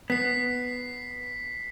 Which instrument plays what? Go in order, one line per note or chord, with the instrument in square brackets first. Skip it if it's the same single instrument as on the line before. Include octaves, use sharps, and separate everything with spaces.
[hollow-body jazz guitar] B3 [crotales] B6 C7